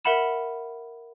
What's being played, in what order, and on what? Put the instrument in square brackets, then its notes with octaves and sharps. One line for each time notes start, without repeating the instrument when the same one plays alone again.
[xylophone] A#4 E5 F#5 B5 E7